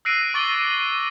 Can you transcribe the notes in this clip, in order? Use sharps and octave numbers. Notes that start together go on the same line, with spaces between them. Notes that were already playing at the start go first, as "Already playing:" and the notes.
E6 F#6 A#6 C7 D7 D#7
C#6 D6 A6 D7 F#7 G7
D7